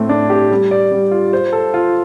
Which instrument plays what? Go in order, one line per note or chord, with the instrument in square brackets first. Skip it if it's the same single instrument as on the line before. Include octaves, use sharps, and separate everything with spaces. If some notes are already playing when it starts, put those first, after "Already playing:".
Already playing: [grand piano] A2 A3 C4
D4
G4
G3
D5
G3
F4
C5
A4
F4